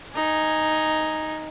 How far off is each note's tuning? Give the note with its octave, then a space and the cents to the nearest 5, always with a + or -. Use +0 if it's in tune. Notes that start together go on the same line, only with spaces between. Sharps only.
D#4 +0 G#5 +0